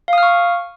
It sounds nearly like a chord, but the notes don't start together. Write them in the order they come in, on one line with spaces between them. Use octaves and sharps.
F5 D#6 F6 C#6